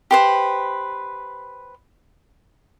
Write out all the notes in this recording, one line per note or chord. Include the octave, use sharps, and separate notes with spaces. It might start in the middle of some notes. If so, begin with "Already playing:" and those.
G4 B4 C5